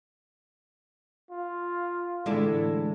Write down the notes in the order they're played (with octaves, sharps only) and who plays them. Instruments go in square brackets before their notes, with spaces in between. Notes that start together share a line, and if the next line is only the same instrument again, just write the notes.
[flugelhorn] F4
[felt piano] A2 D3 E3 [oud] G#3 E4 D5 [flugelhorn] A4